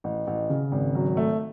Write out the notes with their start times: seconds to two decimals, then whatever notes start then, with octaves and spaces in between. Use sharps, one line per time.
0.04 A1
0.27 A1
0.50 C#3
0.72 G#1
0.95 F#3
1.17 A3